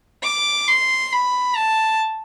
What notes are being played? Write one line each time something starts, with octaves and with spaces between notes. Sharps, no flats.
D6
C6
B5
A5